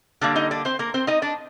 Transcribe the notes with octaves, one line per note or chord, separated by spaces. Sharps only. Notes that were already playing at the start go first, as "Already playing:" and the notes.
D3 G3 A#3 D4 D5
D#4 D#5
D4 D5
C4 C5
A#3 A#4
C4 C5
D#4 D#5
D4 D5